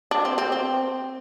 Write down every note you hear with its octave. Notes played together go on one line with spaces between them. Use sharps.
D4
C4
C4
C4